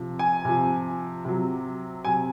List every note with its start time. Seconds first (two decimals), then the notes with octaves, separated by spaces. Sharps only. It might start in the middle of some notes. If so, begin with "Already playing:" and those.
Already playing: C3 F3
0.19 G#5
0.45 C3 F3
1.25 C3 F#3
2.04 C3 F#3 G#5